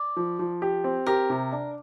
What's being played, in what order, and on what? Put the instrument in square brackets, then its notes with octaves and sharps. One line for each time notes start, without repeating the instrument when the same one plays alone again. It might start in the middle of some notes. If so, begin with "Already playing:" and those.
Already playing: [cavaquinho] D5
[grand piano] F3
F3
G4
C4
[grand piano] G4 [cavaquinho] A#4
[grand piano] C3
D4